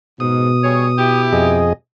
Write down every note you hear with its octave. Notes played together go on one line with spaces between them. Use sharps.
G#2 B2 D#6
G3 G#4 C#5
E4 G4
F2 G#4 D#5